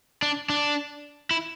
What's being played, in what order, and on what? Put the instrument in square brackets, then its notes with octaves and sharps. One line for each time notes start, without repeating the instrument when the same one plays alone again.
[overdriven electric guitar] D4
D4
E4